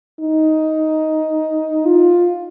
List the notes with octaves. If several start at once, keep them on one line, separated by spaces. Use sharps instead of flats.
D#4
F4